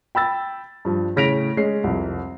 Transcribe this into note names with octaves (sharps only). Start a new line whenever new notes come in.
G5 B5 E6 A6
G2 F3
A2 C#3 A#6 B6 D7 F7
G#3 C#4 C7
C2 F2